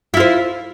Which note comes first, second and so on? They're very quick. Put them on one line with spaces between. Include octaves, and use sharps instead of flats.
E4 F4 C5